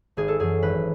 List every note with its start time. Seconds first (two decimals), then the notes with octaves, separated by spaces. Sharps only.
0.17 G#1 G#4
0.28 A4
0.39 F#2 E3 G#4
0.62 G#1 B4